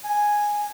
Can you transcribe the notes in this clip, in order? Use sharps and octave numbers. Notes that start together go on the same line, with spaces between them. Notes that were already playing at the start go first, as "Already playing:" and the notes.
G#5